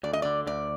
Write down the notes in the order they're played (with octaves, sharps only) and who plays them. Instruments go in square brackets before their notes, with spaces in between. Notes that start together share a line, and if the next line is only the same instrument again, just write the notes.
[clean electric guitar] D2 [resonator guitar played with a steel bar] D5
[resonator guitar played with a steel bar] D#5
[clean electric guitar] D3 [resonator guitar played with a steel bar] D5
[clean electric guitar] D2 [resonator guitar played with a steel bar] D5